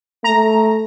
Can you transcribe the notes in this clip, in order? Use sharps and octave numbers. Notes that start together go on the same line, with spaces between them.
A3 A#5